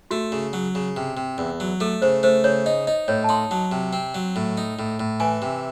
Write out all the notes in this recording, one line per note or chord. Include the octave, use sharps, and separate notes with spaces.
A3 F#4
C#3
F#3
C#3
C3
C3
E2
F#3
A3 A4
C#3 C5
A3 C5
C#3 C#5
D#4 D#5
D#4 D#5
A2 C#5
A5
D#4 C6
F#3 A5
C3
C4
F#3
A2
D#4
A2
A2
E3 G#5
C3